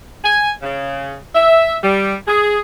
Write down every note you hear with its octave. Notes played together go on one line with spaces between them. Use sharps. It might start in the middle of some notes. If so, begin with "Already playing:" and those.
G#5
C#3
E5
G3
G#4